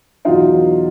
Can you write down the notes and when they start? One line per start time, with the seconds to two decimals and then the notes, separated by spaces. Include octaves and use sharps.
0.25 E2 B2 F#3 D#4 F4